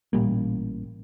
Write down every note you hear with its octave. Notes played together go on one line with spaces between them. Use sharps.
A1 A#2 G3 A#3